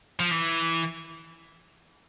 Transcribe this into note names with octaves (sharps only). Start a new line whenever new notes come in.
F3
E3